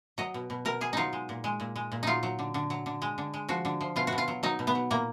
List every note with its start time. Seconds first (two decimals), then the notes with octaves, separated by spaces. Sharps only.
0.18 F#3 D#5
0.34 B2
0.50 B2
0.65 B2 A#4
0.81 B2 G#4
0.93 F#3 D#4 F4
1.13 G#3
1.29 A#2
1.44 G#3
1.60 A#2
1.76 G#3
1.92 A#2
2.03 F#3 D#4 F4
2.23 F#3
2.39 D3
2.54 D3
2.70 F#3
2.86 D3
3.02 G#3
3.18 D3
3.34 G#3
3.49 F3 F#4
3.65 D3
3.81 F3
3.96 B2 F4
4.07 F#4
4.12 B2
4.18 F4
4.28 F#3
4.43 F#3 D#4
4.59 B2
4.67 B3
4.75 F#3
4.91 A#2 A#3